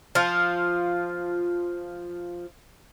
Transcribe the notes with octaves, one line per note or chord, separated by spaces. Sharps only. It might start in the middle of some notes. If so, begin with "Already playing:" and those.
F3 F4